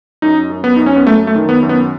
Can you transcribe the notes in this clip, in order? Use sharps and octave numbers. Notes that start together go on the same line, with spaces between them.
F#2 D#4
F#2
B3
F#2 D#4
C#4
B3
F#2 A3
A3
D#3
B3
F#2
B3